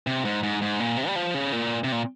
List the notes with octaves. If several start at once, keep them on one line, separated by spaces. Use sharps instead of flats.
C3
G#2
G#2
G#2
A#2
C3
G3
F3
C#3
A#2
C3
A#2